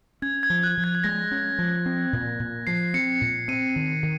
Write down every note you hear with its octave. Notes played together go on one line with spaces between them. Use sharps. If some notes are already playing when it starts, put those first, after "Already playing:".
C#4 G#6
G#6
F3
F#6
F3
G#6
G#6
G#3 A#6
C#4
F3
C4
A#2
A#2
F3 C7
C4 C#7
A#2
C4 D#7
D#3
D#3